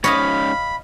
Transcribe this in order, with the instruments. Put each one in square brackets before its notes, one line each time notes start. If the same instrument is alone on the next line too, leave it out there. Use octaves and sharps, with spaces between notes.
[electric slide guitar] G#3 C#4 D#4 [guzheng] C#5 [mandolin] D#5 F5 D#6 [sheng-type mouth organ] B5